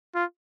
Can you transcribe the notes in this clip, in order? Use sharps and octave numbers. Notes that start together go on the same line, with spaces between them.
F4